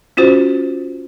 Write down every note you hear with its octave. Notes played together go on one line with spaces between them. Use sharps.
C#4 F4 F#4 C5